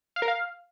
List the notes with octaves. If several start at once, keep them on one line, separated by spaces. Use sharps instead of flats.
F5
A#4
F5